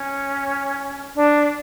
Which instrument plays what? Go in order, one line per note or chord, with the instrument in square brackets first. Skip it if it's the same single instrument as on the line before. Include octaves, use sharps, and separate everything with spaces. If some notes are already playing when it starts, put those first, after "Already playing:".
Already playing: [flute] C#4
D4